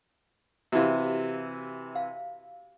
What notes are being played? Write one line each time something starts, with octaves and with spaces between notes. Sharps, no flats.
C3 E3 F#4 G4 F5
F5